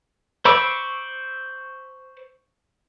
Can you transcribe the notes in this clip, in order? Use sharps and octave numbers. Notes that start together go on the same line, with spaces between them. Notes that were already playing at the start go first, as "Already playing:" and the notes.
C5 B5 C#6 D6 E6